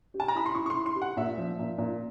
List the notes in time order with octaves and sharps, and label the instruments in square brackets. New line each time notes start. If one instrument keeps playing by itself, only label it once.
[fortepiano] G4
[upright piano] A5
A#5
[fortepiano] E4 [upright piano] B5
[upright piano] C6
[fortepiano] E4 [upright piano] C#6
[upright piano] C#6
C6
[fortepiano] E4
[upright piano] C6
[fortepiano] G4
[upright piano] F#5
[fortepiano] A#2 [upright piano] E5
[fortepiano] F3
A#2
A#2